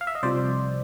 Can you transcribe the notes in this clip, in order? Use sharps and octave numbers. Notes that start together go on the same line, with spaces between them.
F5
E5
D#5
C2 C3 F3 C5 D5